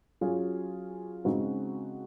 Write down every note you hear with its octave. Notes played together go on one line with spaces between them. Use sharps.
F#3 C#4 F4 G#4
C#3 G#3 C4 D#4 F#4